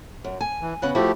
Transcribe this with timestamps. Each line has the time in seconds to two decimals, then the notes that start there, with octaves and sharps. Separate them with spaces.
0.24 F#2
0.41 G#5
0.61 E3
0.82 C#3 B3 C#4 F#6
0.95 F3 A3 E4 F#4 G4